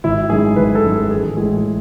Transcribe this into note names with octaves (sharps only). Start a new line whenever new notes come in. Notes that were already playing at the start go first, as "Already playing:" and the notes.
G#1 E4
F#2 D#3 G#3 C#4 G#4
G#1 B4
A4
F#2 D#3 G#3 C#4
G#4
A1 G#4
A2 E3 G#3 G#4